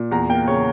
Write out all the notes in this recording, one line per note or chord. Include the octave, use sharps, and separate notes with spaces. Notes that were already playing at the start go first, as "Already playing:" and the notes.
Already playing: A#2
E2 A#5
A#3 G5
C#3 C#5